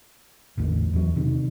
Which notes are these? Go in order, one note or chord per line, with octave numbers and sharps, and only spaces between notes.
A1 E2 A2 D3
E2 F#3
C3 D#3